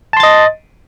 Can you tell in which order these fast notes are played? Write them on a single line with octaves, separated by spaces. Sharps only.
A5 C6 A6 D#5